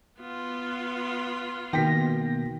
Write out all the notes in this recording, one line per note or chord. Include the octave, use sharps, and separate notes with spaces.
B3 F4
B2 D#3 A#3 G5 A#6 B6